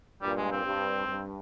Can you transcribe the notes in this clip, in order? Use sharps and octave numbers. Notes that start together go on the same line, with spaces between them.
G2 A#2 G3
G#3
C4
G2
G2